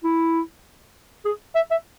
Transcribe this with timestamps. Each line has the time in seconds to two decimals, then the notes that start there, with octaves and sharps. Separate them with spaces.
0.04 E4
1.25 G#4
1.55 E5
1.71 E5